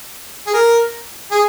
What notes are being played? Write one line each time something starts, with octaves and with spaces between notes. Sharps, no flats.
G#4
A#4
G#4